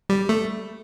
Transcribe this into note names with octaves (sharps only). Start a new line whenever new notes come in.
G3
A3